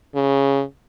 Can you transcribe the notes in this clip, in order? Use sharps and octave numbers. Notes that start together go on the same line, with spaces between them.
C#3